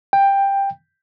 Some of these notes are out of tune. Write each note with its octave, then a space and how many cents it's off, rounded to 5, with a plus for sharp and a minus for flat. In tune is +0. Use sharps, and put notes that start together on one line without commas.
G5 +15